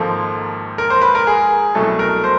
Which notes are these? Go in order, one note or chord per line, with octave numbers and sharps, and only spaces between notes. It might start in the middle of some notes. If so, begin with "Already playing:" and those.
Already playing: G#1 G#2 F3 A#3 A4
A#4
C5
B4
A#4
G#4
C2 B2 F#3 A3 A4
A#4
C5